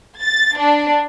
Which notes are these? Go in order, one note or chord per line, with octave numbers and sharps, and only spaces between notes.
A6
D4